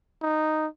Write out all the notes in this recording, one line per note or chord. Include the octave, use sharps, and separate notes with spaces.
D#4